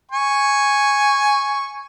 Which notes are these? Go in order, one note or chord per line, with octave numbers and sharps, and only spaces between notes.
G#5 C#6